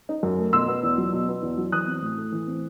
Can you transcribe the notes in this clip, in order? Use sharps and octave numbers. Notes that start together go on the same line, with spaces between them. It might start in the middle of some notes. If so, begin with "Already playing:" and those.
D#4
F#2
A3
B2 C6 E6
B3
E2
F#3
B2
B3
E2
F#3
E3 D#6 F#6
C4
A2
A3
E3
C4